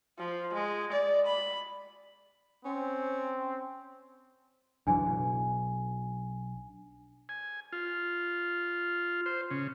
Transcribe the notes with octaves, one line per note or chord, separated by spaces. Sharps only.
F3
G#3
D5
B5
C4 C#4
C#2 F#2 E3 D4 G#5
B1
G#5
F4
C5
C#3